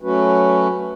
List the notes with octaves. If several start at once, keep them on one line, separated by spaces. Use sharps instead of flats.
F#3 A3 C#4 F#4 B4